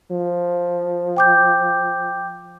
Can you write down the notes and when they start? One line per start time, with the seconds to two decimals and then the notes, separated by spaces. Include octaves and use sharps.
0.11 F3
1.17 G5 D6 G6